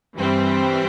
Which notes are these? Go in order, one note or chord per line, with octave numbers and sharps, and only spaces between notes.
G2 E3 G3 C4